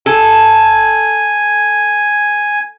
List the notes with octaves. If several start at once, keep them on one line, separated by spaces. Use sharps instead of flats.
A4 G#5